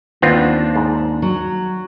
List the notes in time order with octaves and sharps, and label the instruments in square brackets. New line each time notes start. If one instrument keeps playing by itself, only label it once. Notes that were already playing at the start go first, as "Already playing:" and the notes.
[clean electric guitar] D#2 [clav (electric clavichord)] B3 C4 F4 [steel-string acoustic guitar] D4
[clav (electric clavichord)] G#2
[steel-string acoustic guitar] F#3